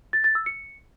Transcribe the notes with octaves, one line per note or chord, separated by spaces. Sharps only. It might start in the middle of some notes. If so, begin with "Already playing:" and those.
A6
A6
E6
C#7